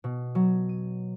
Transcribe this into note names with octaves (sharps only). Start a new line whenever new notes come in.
B2
F#3
D#7